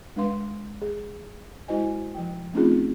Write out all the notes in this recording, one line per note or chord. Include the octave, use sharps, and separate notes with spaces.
G#3 D4 B4 F5 C6
G#4
G#3 E4 F#4 C5 D#5 G#5
F3 G5
A3 C4 C#4 D#4 F4 G#4